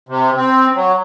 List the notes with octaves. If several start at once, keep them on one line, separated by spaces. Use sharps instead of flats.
C3
C4
F#3